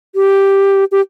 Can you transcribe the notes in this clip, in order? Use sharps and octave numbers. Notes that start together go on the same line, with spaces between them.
G4
G4